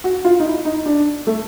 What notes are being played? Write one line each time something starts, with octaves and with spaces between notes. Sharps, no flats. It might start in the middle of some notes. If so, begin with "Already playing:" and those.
F#4
F4
D#4
E4
D#4
D4
A3